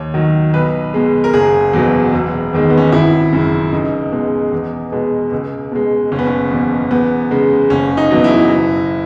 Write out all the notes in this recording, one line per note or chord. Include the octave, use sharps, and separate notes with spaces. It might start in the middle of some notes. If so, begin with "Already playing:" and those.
Already playing: D#2 C#5
D#3 F#3
B1 B4
B2 G#3
A#4
F#1 G#4
E2 B2 F#3
E1
E2 D#3 G#3
B3
C#4
D#4
G#1 E4
F#2 C#3
C#2 D#4
B2 G#3
E2
B2 G#3
C#2
B2 G#3
F#1 C#4
B3
C#4
E2 B2
E2 B3
C#3 G#3
F#1 C#4
D#4
E2 B2 F#3
E4
F#1